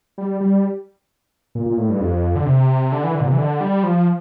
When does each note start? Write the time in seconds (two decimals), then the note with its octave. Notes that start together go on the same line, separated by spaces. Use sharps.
0.18 G3
0.41 G3
1.55 A#2
1.66 A#2
1.78 A2
1.89 G2
2.01 F2
2.36 D3
2.46 C3
2.92 D3
3.04 E3
3.15 D3
3.21 A#2
3.26 C3
3.33 E3
3.38 D3
3.61 G3
3.83 F3